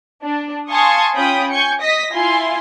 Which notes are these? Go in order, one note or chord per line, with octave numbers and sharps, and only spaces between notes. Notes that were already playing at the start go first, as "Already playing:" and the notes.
D4
F5 G#5 A5 C6 C#6 D#6
C#4 F4 G5 B5 D#6
G#5 C#6 G6 C#7
D#5 D#6 A#6 B6
E4 F4 G#5 C6